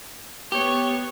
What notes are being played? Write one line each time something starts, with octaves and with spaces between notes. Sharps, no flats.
B3 G4 C#5